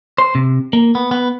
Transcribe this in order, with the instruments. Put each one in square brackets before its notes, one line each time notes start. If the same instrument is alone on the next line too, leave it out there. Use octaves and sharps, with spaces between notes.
[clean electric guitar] C5
C3
A#3
B3
B3